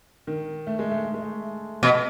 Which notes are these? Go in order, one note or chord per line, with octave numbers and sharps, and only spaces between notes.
D#3
A3
G#3
A3
A3
G#3
A3
B2